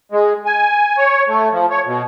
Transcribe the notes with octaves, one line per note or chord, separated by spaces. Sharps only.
G#3
G#5
C#5
A3
F3
C#5
B2